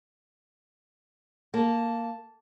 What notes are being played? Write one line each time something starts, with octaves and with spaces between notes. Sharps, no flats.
A#3 A5